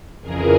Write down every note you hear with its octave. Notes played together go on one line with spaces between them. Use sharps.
F2 C#3 E3 G#4 A#4